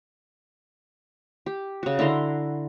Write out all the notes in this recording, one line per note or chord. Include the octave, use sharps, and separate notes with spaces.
G4
C#3 F#4
D3 E4 A#5 C6